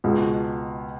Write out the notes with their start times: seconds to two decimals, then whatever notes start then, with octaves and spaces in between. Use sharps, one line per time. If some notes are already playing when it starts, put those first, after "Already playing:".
0.04 C#2 B2 G#3